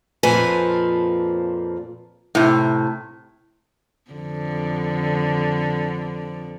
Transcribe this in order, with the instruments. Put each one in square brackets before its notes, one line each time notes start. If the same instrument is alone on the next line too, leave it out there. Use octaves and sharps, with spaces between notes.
[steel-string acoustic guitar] F2 A#2 F3 C4 B4 G#5
[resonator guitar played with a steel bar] A2 C3
[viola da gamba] F2 D3